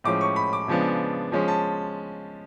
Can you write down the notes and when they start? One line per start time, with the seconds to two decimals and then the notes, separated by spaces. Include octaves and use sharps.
0.04 A2 F3 G#3 C#4 D6
0.21 C#6
0.36 B5
0.53 D6
0.68 C#3 F3 G#3 B3 D4
1.32 F3 G#3 C#4
1.48 A5